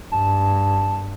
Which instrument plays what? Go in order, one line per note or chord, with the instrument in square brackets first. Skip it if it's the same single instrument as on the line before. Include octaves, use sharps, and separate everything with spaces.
[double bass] G2 [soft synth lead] A5